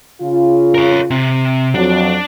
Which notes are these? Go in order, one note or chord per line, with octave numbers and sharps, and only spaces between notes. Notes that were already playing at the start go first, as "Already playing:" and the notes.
C#3 F4
A#4 C#5
C3
F2 F#3 D4